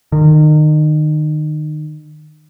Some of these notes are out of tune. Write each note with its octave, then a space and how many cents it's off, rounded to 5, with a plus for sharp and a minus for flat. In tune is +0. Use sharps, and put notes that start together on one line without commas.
D#3 -30